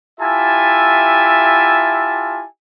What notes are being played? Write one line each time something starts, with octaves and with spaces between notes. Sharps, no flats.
E4 F4 G4 E5 G#5 A5